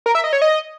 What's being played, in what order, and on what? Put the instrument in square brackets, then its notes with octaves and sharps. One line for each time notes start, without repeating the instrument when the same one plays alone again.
[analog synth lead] A#4
E5
D#5
C#5
D#5